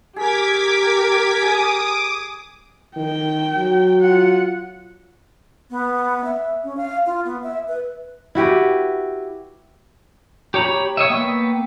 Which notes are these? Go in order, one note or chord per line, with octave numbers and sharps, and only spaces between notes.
G4 G#4 A#4 D6 G#6 B6
G#4 G#5 D6 D#6
D#3 G5
F#3
F4 F#5
B3
E5
C#4
F5
F4
B3
E5
B4
E4 F#4 G4 B4
G4 C#5 A#5 B5
C#5 D#5 E5
A#3 B3 G5 C#6 E6